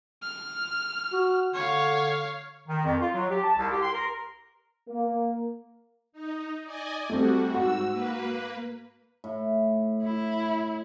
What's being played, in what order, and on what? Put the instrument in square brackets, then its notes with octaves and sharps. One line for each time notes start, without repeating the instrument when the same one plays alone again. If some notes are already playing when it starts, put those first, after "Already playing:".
[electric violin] F6
[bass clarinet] F#4
[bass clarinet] D3 [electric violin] C#5 F5
[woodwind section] D#3
F2
F4
F#3
G4
A5
C2
G4
C6
A#4
[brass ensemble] A#3
[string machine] D#4
D5 D#5 G#5
[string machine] G3 F#4 [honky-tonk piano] A3 C4
[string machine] G#2 E6 [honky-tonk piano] F#4
[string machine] A#3 B4
[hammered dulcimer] A2
[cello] E4